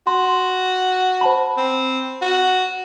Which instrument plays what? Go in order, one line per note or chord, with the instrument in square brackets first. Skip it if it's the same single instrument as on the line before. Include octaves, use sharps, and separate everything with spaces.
[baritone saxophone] F#4 [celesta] C6
[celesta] C5 A5 B5
[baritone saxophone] C4
F#4